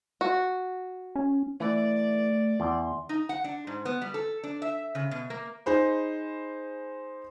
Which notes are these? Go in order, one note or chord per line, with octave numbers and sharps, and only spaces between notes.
F#4
C#4
E3 A3 D5
E2 C6
D#4
F#5
D4
G#2
B3
G3
A4
D4
E5
C#3
B2
A#3
D#4 G#4 C5 B5